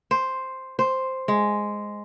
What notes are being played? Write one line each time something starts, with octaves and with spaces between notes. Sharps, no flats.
C5
C5
G#3